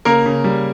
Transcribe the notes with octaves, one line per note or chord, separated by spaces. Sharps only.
C#3 A#3 A#4
C#3
G3